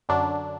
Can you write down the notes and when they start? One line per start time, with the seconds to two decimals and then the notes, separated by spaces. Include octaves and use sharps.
0.09 F#2 D3 F#3 D4